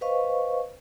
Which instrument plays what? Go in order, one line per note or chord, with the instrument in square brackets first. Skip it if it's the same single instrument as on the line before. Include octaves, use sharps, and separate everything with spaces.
[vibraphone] B4 C5 D#5 F5 C#6